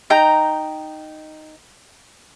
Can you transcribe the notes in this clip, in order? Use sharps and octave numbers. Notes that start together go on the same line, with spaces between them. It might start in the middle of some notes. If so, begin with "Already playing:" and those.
D#4 G5 A#5